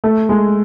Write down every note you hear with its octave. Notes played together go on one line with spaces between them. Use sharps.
A3
G#3